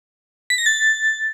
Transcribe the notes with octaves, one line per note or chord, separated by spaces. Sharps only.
B6
A#6
A6